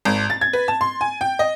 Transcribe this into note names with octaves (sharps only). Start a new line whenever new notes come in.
G#1
A6
G#6
B4
A5
C6
G#5
G5
D#5